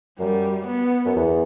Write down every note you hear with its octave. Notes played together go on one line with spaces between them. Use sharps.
F#2 G3
B3
F#2
E2